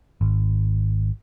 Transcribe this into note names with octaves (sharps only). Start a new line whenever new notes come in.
G#1